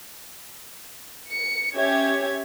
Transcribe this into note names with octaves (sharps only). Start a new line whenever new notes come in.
C#7
C#4 G4 C#5 E5 G#6